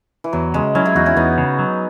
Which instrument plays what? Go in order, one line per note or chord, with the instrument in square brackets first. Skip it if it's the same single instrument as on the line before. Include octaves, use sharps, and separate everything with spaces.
[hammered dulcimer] E3
[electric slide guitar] E2 [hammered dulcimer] F#3
[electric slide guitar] C#3 [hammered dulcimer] G#3
[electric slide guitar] F#3 [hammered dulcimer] C#4 E4
[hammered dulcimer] E4 G#4
[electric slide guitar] E2 [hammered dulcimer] D#4 F#4
[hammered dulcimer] C#4 E4
[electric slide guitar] E2 [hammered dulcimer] B3 D#4
[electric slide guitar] C#3
F#3